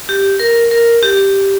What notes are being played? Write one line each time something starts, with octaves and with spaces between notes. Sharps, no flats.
G4
A#4
A#4
G4